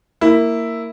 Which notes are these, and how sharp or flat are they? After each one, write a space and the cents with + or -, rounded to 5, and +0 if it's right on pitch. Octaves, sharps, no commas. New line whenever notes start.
A#3 -15 E4 +0